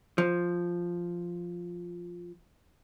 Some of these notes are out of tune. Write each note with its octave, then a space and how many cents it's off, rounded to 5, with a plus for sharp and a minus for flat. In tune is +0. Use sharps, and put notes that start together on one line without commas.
F3 +0